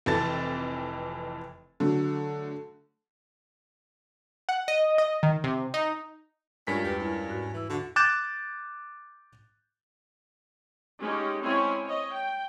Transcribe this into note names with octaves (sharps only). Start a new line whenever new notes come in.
F1 F2 E3 A4 A5 A6
D3 F#3 A3
F#5
D#5
D#5
D#3
C3
D#4
G2 G#3 C#4 F4 F#4 A#4 B6
E2 G4 B4
G3 C#4 E4
G#2 F#4 F#6
E3 E5 E6
D3 F#4
D6 F#6 G6 A6 E7
G#3 C#4 D#4 G4
G#3 C4 C#4 E4 C#5 G#5
C#5 D#5
G5